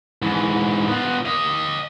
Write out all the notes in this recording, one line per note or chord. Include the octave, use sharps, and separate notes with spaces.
G#2 E3
B3 F4
D#5 F5